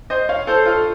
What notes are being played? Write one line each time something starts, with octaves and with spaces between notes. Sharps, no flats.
C5 D#5
C#5 F5
A4 C5
F4 A4